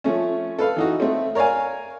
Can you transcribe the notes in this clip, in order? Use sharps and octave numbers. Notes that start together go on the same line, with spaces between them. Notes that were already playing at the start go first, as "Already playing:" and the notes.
F3 A3 C#4
A4 B4 F5
E3 D#4 F#4
A3 C4
A#4 C#5 D5 F5 G#5